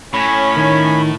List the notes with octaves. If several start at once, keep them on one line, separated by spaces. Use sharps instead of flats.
A2 C#4 B5 B6
D#3